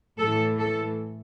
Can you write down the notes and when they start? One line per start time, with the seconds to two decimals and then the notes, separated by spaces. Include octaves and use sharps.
0.18 A2 E3 A4
0.59 A4